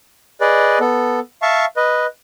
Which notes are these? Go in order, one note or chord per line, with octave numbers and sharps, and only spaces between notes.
G#4 B4 D5 D#5
B3 A4
E5 F5 A5 C#6
B4 D#5